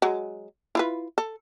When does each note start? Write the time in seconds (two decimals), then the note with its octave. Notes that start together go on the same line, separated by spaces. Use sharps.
0.02 F#3 G#3
0.75 E4 F4 B4
1.18 A4